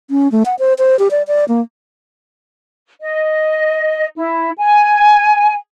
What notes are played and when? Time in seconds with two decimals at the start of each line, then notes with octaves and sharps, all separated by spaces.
0.11 C#4
0.32 A3
0.45 F#5
0.59 C5
0.79 C5
0.99 G4
1.11 D5
1.28 D5
1.48 A#3
3.00 D#5
4.16 E4
4.58 G#5